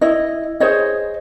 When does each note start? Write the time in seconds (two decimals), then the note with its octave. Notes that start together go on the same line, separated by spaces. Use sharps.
0.01 E4 D#5
0.60 G#4 C5 C#5 D#5